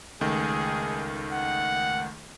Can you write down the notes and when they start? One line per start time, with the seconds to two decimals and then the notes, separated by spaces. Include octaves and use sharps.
0.21 C#2 D#3 A3 G#4
1.32 F#5